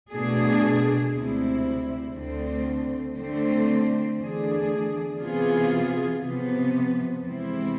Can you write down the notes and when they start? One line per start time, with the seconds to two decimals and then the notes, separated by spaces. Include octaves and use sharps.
0.11 B2 A3 D4 G#4
1.12 D2 C3 G#3 C4 E4
2.14 D2 D3 A3 C4
3.16 D3 A3 C4
4.17 E2 D3 A3 D4 G#4
5.19 C3 E3 B3 F4 G#4
6.21 C3 F3 B3
7.24 E2 C3 G#3 C4 E4